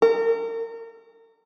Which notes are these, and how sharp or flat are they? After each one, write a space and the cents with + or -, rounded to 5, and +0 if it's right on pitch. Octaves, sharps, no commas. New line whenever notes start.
A#4 -35